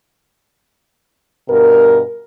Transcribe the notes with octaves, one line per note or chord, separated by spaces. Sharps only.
G2 B2 A#4